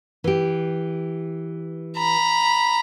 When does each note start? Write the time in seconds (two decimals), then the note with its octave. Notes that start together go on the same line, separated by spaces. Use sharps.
0.24 E3 G4
1.97 A#5 B5